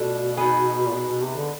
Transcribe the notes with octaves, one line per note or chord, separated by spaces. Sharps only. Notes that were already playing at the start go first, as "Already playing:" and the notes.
Already playing: B2 A3 D4 F4 A4
B3 D#4 G#4 B4
A#2
B2
B2
C3
D3